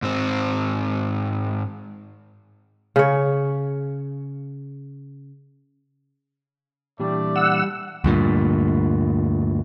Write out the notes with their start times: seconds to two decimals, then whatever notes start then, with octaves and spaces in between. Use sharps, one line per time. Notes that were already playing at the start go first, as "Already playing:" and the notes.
0.02 G#2 C4
2.96 C#3 C#5
7.00 A#2 E3 G3 A3 D4 D5
7.36 F#5 E6
8.04 D2 G2 A#2